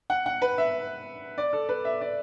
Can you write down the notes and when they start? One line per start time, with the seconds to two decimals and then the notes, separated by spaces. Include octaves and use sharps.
0.10 F#5
0.26 F#5
0.42 B4
0.58 E5
1.38 D5
1.53 A4
1.69 B4
1.85 E5
2.01 D5